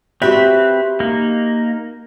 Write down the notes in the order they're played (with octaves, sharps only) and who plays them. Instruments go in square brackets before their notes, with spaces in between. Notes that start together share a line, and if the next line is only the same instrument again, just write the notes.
[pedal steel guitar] C4 B4 [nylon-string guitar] F#4 G4 E5
[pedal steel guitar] A#3 D#4